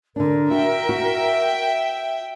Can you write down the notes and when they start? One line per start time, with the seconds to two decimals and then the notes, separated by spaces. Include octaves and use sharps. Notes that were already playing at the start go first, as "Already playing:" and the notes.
0.16 D3 D4 A#4
0.51 F#4 E5 G5
0.89 F#4